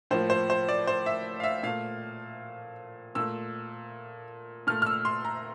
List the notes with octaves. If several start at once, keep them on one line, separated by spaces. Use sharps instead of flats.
A2 F3 A#3 C5
C5
C5
D5
C5
E5
F5
E5
A#2 A3 F5
A#2 A3 E6
A#2 A3 F6
F6
E6
C6
A#5